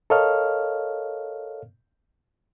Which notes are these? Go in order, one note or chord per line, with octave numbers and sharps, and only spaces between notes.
A4 A#4 C#5 D#5 F5 F6